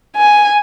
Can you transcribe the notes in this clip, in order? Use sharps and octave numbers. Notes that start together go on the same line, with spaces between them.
G#5